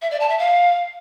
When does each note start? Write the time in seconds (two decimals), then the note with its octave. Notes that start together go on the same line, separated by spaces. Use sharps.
0.02 E5
0.11 D5
0.20 A5
0.29 E5
0.39 F5